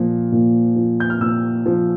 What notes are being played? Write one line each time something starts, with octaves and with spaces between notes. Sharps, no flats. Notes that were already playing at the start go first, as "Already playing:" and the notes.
Already playing: A#2 F3
A#2
F3
G6
F6
A#2 E6
F3